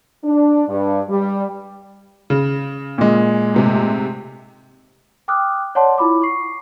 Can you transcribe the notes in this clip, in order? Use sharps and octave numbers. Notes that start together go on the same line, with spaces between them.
D4
G2
G3
C#3
A#2 G#3
G#2 C3 A3
G5 D6 D#6 F6 F#6
C#5 D5 F#5 A5 C6
E4 F4 B5 D6
C#6 C7